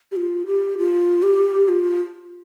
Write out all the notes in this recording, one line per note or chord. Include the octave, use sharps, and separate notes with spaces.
G4
F4
G4
F4
G4
F4